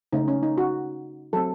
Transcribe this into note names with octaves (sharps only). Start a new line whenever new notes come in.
C#3 A3 C#4 D#4
C#4
D#4
F#4
F#3 A3 C4 A4